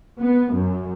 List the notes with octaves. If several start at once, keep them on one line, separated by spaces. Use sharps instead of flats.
B3
F#2